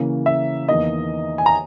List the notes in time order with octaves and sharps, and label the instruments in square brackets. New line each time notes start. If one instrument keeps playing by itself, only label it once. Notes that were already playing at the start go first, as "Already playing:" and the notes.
Already playing: [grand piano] C#3 E3 A#3
E5
E2 D#3 A#3 D#5
G#5
A#5